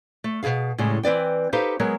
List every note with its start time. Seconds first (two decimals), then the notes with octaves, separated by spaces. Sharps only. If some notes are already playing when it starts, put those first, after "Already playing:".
0.24 A3
0.43 B2 D#3 G#4 F5
0.78 A2 C#3 G3 G#3
1.03 E3 C4 B4 D5 G5
1.53 D#4 G4 A4 B4 C5 F5
1.80 F#3 G#3 B3 A#4